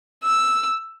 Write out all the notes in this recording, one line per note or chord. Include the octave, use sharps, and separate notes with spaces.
E6